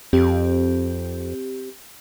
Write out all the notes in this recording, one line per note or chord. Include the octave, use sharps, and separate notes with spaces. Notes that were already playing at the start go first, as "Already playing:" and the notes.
F2 C4 G4